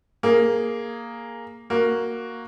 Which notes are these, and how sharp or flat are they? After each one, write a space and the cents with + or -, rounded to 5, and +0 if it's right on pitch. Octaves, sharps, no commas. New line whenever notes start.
A#3 +0 G#4 +0
A#3 +0 F#4 +0